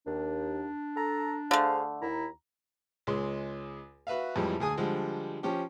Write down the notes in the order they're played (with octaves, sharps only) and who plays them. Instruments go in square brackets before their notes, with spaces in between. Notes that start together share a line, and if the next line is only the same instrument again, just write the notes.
[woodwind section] D#2 [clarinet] D4
[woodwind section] A4 A#5
[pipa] D3 A3 [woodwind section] G#4 C5 F5
[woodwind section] D#2 A#5 [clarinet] E4
[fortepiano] C#2 G#3 C6
F#4 B4 E5 F5
F2 A2 E3 G3 G#3
D2 G#4 G#5 D#6
D3 F3 G3 G#3
F3 C#4 G4